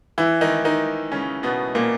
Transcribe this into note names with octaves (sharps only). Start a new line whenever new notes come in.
E3 E4
D#3 D#4
D#3 D#4
C#3 C#4
B2 B3
A#2 A#3